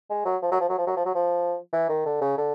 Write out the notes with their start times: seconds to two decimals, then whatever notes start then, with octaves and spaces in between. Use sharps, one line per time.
0.10 G#3
0.25 F#3
0.42 F3
0.51 F#3
0.60 F3
0.69 F#3
0.78 F3
0.87 F#3
0.97 F3
1.05 F#3
1.14 F3
1.73 E3
1.89 D#3
2.05 D3
2.21 C#3
2.37 D3